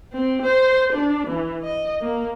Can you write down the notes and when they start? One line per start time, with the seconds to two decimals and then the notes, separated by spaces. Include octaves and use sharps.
0.13 C4
0.43 C5
0.93 D4
1.28 E3
1.63 D#5
2.01 A#3